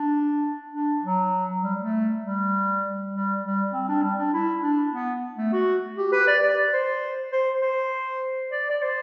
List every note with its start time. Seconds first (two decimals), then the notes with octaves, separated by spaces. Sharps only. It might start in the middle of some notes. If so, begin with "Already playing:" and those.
Already playing: D4
0.73 D4
1.03 F#3
1.63 G3
1.79 A3
2.23 G3
3.13 G3
3.43 G3
3.73 C4
3.89 D4
4.02 G3
4.19 D4
4.34 E4
4.62 D4
4.92 B3
5.37 A3
5.53 F#4
5.98 G4
6.12 B4
6.27 D5
6.43 D5
6.72 C5
7.32 C5
7.62 C5
8.52 D5
8.70 D5
8.82 C5